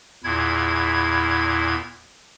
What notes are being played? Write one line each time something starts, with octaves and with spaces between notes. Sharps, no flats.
E2 A#2 E4 G#6